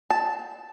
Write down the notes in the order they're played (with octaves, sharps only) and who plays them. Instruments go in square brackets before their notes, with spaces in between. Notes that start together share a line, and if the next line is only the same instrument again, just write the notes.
[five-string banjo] A5